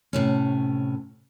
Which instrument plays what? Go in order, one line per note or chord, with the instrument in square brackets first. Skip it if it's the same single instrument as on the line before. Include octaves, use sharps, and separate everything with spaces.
[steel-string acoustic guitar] A2 C3 C#4